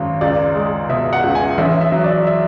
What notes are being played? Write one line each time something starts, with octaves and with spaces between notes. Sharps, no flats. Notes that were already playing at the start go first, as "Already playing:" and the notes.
Already playing: G#1 F#2
C#2 D5
G#3
B2 E5
F#5
C#2
G#5
A1 E5
E5
F#3
D5
E5